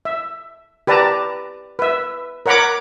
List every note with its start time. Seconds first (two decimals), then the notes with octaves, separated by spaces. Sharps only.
0.05 E5
0.87 G4 B4 D5 A5 A#5
1.79 B4 E5
2.46 A#4 C#5 F#5 A#5 B5 D6